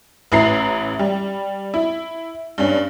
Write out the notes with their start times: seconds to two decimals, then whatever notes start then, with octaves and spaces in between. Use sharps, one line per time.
0.32 A1 E4 A#5 C7
0.99 G3
1.74 E4
2.58 G2 C#4